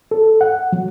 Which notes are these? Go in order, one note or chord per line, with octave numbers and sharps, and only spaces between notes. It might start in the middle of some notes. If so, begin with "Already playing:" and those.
A4
F#5
F#3